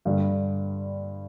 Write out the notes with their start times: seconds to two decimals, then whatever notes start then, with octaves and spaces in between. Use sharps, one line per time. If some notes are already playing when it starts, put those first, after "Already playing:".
0.05 G2 D3 G3 D4